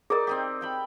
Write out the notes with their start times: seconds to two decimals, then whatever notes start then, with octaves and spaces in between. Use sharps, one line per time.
0.10 D#4 G#4 A#4 D5
0.27 C4 D#4 G4
0.61 E5 G5 B5